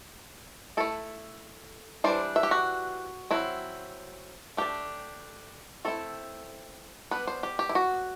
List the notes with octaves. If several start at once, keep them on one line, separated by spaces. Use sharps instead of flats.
A3 E4 A4
E3 G3 D4 C5
E5
G4
F#4
F#3 C4 E4
A3 D4 G4
A3 C4 E4 A4
G3 B3 D4 B4
C5
G4
G4
E4
F#4